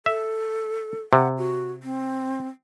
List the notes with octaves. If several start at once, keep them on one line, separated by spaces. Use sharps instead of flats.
A4 E5
C3 F#5
F#4
C4